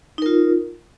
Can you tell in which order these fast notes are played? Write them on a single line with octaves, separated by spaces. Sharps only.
D#4 A#4 F4